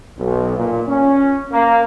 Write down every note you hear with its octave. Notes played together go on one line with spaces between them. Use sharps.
B1
A#2
C#4
A#3